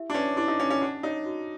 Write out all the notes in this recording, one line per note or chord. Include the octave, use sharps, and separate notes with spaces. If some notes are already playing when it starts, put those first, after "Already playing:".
Already playing: E4 G4 E5
D4
C#4 B4
D4 E4
D#4
C#4 G4
C#4
D4 F#5
D#4 C#5
F#4